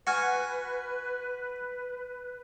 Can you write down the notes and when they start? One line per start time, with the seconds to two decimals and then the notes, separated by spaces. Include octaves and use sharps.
0.07 F#4 B4 F#5 G#5 F6